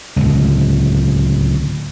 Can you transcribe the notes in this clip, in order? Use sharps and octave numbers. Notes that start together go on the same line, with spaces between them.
D1 C#2